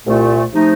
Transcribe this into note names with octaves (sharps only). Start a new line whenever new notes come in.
C2 A#2 A3
C3 F3 A3 D#4